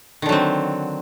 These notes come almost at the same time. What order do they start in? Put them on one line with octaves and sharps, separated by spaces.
D#3 D3 F#3 C4